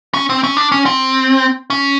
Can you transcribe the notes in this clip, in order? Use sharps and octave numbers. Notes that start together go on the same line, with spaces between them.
C#4
C4
C#4
D4
C#4
C4
C#4